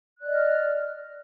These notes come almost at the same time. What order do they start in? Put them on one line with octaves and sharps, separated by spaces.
F#6 D5 D#5 F6